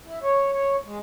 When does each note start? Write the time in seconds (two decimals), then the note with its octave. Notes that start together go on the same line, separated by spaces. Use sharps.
0.05 E4
0.23 C#5
0.52 C#5
0.84 G#3